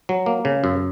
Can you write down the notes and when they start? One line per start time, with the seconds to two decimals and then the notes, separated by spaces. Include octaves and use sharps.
0.09 F#3
0.26 A#3
0.45 C#3
0.64 F#2